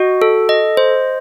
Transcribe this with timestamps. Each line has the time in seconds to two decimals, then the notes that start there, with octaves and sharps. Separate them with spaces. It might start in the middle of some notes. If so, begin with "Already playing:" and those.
Already playing: F#4 D#5
0.22 A4
0.49 D#5
0.77 C5